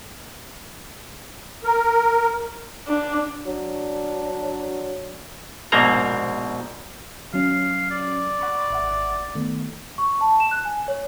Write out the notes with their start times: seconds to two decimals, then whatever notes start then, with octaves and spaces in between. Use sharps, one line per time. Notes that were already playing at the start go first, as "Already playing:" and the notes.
1.64 A#4
2.87 D4
3.47 F#3 D4
5.72 A#1 G#2 B2 A#3 C4 A#5
7.34 F#3 C#4 F5
7.91 D5
8.40 F#5 B5 C#6
8.70 G#1 E5 F#5
9.35 D#3 A3 B3
9.98 C#6
10.21 A5
10.40 E7
10.51 F#6
10.65 G#5
10.88 C#5